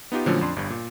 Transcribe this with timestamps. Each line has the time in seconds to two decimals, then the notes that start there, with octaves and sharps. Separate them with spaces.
0.12 B3 D#4 F4 G4
0.26 A#2 D3 F3 F#3 A3 C#4
0.41 F2 D4 C6
0.56 G1 G2
0.70 A#2